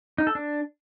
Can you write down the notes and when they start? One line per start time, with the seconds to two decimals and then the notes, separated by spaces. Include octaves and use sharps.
0.18 D#4
0.27 A4
0.35 D4